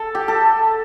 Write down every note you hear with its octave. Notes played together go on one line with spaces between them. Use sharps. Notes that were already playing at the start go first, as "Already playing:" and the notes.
Already playing: A4
G4
A4